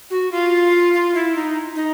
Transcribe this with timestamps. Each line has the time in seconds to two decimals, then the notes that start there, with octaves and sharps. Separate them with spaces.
0.10 F#4
0.32 F4
0.93 F4
1.14 E4
1.35 D#4
1.76 D#4